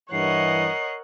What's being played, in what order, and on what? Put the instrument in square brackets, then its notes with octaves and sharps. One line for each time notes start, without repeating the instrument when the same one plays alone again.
[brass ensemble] G2 E3 [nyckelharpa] A#4 F#5 [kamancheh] C#5 D#5 [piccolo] C7